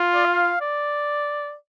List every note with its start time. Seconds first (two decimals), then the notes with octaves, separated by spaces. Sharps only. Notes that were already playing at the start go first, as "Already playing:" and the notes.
Already playing: F4
0.14 D5
0.25 F5
0.61 D5